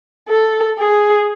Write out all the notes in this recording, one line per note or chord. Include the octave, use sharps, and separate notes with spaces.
A4
G#4